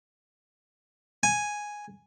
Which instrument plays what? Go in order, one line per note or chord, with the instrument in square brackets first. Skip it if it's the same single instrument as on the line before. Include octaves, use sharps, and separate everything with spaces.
[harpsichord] G#5